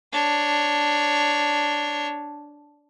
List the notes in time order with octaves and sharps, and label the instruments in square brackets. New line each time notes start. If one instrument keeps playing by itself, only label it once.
[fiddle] D4 C#5